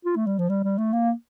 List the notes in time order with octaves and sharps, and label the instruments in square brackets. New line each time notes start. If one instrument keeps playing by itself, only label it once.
[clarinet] F4
A3
G3
F3
G3
G3
A3
A#3